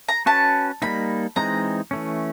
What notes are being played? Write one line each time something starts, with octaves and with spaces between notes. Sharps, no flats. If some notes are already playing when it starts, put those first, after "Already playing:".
A#5
C#4 F#4 B4 A5
G3 A#3 D#4 B5
E3 G#3 C4 D#4 A#5
E3 A3 C#4